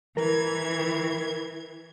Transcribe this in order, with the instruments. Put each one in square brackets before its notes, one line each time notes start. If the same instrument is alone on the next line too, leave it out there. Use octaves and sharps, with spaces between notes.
[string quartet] E3 G#6 [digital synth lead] A#4